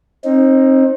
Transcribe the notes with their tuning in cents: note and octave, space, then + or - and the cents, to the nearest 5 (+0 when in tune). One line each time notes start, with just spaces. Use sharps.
C4 +30 D#4 +0